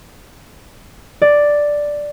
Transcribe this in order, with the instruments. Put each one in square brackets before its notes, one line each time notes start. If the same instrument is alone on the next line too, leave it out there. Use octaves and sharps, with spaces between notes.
[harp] D5